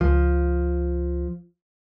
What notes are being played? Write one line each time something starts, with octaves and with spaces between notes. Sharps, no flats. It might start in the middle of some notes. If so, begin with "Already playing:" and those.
C#2 F3